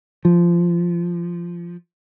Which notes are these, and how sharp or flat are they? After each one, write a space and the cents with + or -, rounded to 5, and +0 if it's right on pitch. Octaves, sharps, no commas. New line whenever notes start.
F3 -15